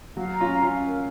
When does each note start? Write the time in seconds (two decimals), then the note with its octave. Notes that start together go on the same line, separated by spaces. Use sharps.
0.16 F#3 F5
0.34 A#5
0.41 C#4 F4
0.52 F5
0.63 C#4 F4
0.69 F5
0.87 A#4